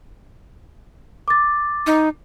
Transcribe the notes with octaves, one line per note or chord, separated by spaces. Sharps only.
D6 A6
D#4